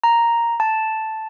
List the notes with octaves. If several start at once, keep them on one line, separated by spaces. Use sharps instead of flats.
A#5
A5